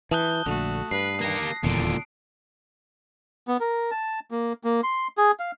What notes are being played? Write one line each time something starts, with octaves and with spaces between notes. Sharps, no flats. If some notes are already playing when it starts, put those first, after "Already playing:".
E3 A5 D#6 F#6 G6
A#1 D3 A3 F#4
G2 B4 C7
A#3 G4 A#6
D#1 E2 A#2 D3 D7
B3
A#4
A5
A#3
A#3
C6
G#4
F5